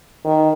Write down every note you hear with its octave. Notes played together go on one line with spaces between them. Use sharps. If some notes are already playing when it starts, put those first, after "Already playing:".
D#3